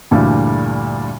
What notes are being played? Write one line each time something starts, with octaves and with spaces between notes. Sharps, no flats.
D2 G2 A#2 E3 G3 A3